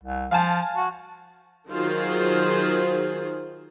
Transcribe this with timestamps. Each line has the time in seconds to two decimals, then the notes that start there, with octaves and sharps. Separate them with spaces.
0.04 C2
0.31 F3 F5 G#5 A5
0.77 F#4
1.69 D#3 F#3 F4 G#4 C5